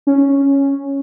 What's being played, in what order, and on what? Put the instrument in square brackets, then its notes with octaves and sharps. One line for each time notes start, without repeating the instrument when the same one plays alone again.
[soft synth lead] C#4